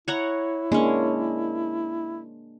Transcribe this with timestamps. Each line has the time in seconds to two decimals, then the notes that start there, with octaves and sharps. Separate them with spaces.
0.08 E4 C#5 F#5 A#5
0.72 G#3 A#3 C#4 D4